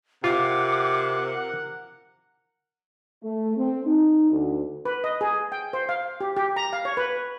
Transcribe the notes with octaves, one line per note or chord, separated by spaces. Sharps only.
C3 F4 A#4 F#5 D6
A3
C4
D#4
D2
B4
D#5
G#4
G5
C5
F5
G4
G4
A#5
F5
C#5
B4